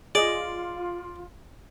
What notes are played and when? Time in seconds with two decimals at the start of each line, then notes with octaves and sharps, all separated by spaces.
0.15 F4 G#4 D5 D#5